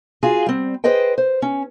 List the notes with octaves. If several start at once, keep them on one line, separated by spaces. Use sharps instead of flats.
F4 F#4 G#4 F5
G3 C4
G#4 B4 C5 D#5 G5
C5
C#4